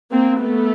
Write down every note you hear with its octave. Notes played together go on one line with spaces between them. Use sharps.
A#3 C4
A3 B3